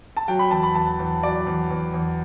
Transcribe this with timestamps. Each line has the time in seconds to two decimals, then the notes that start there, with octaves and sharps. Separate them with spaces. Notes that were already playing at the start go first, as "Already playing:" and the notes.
0.17 A5
0.28 F#3 G5
0.39 B5
0.51 E2 A5
0.63 B5
0.75 E2 A5
1.00 E2
1.23 F#3 D5
1.47 E2
1.71 E2
1.94 E2